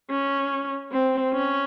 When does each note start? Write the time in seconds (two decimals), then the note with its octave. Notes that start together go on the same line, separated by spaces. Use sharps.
0.10 C#4
0.92 C4
1.33 C#4